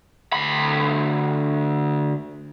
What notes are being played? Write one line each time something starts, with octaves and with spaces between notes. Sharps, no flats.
D2 B5